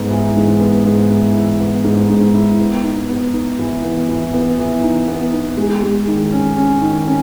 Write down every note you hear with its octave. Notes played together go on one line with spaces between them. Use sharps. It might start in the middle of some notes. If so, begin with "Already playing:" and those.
Already playing: G#2 B3
E3
G#2
B3
G#2
E3
E4
B3
G#2
G#2
E4
B3
D#4
B3
D#4
E3
B3
E3
B3
E3
D#4
B3
D#4
G#3
G#3
D#3
C#4
C#4
D#3
C#4